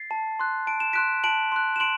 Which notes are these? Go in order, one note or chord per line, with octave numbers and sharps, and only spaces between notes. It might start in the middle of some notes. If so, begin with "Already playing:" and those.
Already playing: A6 C7
A5
C6 F#6
A5 D7
E7
C6 F#6 B6 D7
A5 D7 F#7
C6 F#6
E7
C6 D7 F#7